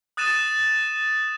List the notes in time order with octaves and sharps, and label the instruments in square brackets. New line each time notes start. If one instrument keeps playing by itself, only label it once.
[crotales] D#6 F#6 A6 D#7 E7